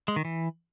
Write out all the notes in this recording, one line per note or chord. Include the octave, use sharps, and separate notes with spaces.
G#3
D#3
E3